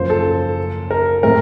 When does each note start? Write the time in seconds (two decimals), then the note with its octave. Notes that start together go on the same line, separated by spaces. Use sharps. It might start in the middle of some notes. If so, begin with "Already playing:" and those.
Already playing: F#1 F#2 F3 C5
0.10 A4
0.91 A#4
1.23 A2 A3 C4 A#4